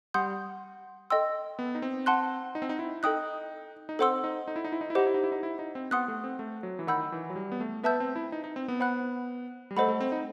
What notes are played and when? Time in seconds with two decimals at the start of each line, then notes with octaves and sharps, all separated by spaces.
0.14 G3 F#5 C6 D#6 G6
1.10 A4 D#5 G5 C6 E6
1.59 B3
1.75 D#4
1.82 C4
2.06 F#5 A5 C6 F#6
2.55 D#4
2.62 C4
2.69 D#4
2.79 E4
3.03 D#4 A4 D#5 G5 D#6 F#6
3.89 D#4
3.99 C4 A4 C5 F#5 C6 E6
4.24 D#4
4.48 D#4
4.56 E4
4.65 D#4
4.72 E4
4.81 D#4
4.90 E4
4.95 D#4 G4 C5 D#5 F#5
5.06 E4
5.14 D#4
5.24 E4
5.32 D#4
5.43 E4
5.59 D#4
5.75 C4
5.91 B3 F#5 C6 D#6 F#6
6.08 A3
6.24 C4
6.39 A3
6.63 F#3
6.79 E3
6.87 D#3 F#5 B5 E6 G6
7.12 E3
7.30 F#3
7.36 G3
7.52 B3
7.60 A3
7.83 B3 B4 E5 A5 E6 G6
8.00 C4
8.16 E4
8.32 D#4
8.44 D#4
8.56 C4
8.68 B3
8.80 C5 F#5 B5 F#6
9.71 G3
9.77 A3 A4 C5 D#5 F#5 B5
9.88 A3
10.01 C4
10.12 D#4